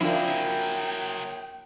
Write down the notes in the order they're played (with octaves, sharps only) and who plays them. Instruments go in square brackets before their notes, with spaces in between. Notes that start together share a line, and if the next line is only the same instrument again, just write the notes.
[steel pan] F3 D4 [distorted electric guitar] F#3 G#4 [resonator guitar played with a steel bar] A#3 E4 [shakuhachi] G5